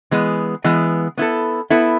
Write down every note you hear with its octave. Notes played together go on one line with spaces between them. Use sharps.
E3 G#3 B3
E3 G#3 B3
B3 E4 A4
B3 E4 A4